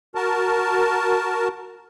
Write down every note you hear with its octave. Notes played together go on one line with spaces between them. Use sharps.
F#4 A#4 A5